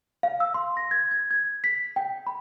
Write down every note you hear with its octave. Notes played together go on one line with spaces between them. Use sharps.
F5
E6
C6
A#6
G#6
G#6
G#6
B6
G5
B5